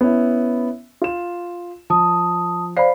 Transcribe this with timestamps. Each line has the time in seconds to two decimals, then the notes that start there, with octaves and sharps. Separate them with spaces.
0.01 B3 C#4 E4
1.02 F4 E7
1.90 F3 A5 D#6
2.77 C5 D5 F5 B5 C7